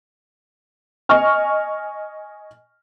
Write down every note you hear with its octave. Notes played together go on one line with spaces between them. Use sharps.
D#5 G#5 C#6 F6